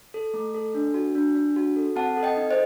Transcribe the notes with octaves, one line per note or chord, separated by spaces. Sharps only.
A4
A3
A4
D4
F#4
D4
D4
F#4
A4
C4 F#5 A5
A4
D#5 G5
D#4
C5 D#5